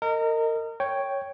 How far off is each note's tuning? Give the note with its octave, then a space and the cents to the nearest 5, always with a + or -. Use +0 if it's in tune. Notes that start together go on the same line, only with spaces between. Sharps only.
A#4 -30 D#5 +0
C#5 +0 G5 +0